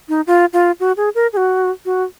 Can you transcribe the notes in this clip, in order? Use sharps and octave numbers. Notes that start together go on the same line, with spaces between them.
D#4
F4
F4
F#4
G#4
A#4
G#4
F#4
F#4